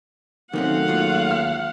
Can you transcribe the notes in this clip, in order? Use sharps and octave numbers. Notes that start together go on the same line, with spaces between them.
C3 D#3 F#3 A3 C4 C#4 F5 F#5
D#2 G#3 F4
F6